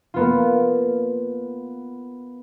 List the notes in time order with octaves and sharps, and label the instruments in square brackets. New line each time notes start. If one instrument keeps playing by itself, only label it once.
[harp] A#3 B3 F4